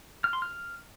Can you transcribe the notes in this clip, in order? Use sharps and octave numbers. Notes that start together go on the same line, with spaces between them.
F6
C6
F6